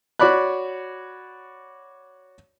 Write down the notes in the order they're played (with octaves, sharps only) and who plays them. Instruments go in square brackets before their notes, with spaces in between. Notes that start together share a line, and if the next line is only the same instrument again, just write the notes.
[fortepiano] F#4 C#5 D5 B5 F#6